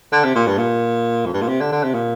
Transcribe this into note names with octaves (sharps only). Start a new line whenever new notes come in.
D3
C3
A#2
G2
A#2
F2
G2
A#2
C3
D3
D3
C3
A#2